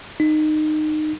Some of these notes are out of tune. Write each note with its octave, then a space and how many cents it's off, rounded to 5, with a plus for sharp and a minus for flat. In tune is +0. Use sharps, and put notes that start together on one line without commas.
D#4 -20